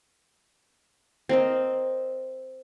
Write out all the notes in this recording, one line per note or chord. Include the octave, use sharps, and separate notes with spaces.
C4 A#4 D#5